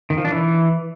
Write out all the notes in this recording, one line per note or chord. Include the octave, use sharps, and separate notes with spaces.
D#3
F3
D4
E3